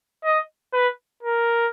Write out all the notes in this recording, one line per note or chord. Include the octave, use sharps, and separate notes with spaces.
D#5
B4
A#4